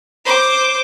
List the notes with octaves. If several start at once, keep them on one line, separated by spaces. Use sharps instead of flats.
C5 D6